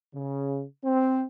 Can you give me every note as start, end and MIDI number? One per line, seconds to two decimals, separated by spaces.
0.14 0.64 49
0.84 1.23 60